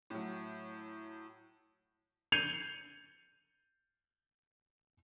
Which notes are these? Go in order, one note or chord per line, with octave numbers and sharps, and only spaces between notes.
A2 F#3
G6 G#6 C7 C#7 D#7 F7